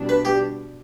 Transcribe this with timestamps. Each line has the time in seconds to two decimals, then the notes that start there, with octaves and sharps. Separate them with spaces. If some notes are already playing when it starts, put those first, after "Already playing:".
Already playing: B2 G3 D4
0.09 B4
0.25 G4